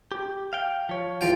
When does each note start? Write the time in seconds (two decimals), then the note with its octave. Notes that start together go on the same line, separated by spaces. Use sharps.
0.12 G4
0.53 F5 G5
0.89 F3 C#5
1.21 E2 F4 G5